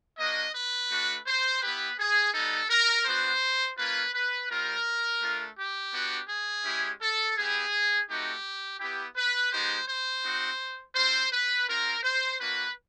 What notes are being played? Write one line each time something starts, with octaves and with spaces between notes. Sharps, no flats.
A#3 D4 F#4 D#5
B4
A3 D4 F#4
C5
B3 E4 G4 B4
G#4
G3 B3 D#4 A4
A#4
B3 D4 F#4 C5
A#3 C#4 F4 B4
B4
G3 C4 F4 A#4
A3 D4 F4
G4
B3 D4 F#4
G#4
G#3 C#4 E4 G4
A4
B3 E4 G4 G#4
A3 C4 D#4 F#4 G4
B3 E4 G4
B4
G#3 B3 D#4 G4 C5
C5
C4 D#4 F#4
C4 F4 C5
B4
C4 F4 A#4
C5
A#3 D4 F#4 B4